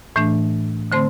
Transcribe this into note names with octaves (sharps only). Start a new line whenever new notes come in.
A2 E3 A3 D4
D3 A3 C4 C5 C6